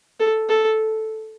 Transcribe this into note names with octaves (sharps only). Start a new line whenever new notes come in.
A4
A4